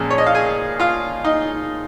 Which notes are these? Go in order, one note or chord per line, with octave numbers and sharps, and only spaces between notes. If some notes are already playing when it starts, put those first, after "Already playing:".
Already playing: A#2 F3 G#3 C#4
C#5
D#5
F5
G#4 G#5
F4 F5
D#4 D#5